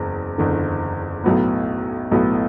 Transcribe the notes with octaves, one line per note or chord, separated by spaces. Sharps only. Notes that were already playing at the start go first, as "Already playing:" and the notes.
Already playing: F#1 E2
F#1 E2 D3
B1 A2 F#3 B3
B1 A2 F#3 B3